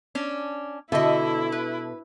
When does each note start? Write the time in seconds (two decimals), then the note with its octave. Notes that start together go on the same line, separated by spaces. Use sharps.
0.15 C#4 D4
0.92 B2 D3 E4 A4 D#5 E5
1.52 B4